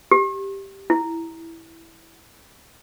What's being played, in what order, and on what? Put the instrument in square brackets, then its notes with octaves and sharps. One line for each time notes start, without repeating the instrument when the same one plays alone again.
[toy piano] G4
E4